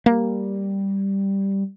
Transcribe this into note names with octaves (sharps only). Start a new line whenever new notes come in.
G3 A#3